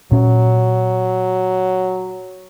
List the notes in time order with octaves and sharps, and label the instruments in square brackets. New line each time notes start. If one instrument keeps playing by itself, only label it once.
[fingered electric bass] A#2 C#4 [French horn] F#3